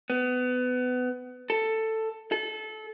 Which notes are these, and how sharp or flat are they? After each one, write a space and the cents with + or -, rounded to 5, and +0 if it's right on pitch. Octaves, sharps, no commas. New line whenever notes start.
B3 +25
A4 +10
A4 -25